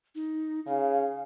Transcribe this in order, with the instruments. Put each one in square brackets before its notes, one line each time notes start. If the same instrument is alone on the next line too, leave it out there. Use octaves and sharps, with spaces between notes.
[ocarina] D#4
[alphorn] C#3 [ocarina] F5